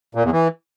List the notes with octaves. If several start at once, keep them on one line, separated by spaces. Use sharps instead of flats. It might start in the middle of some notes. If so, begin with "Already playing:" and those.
A#2
E2
E3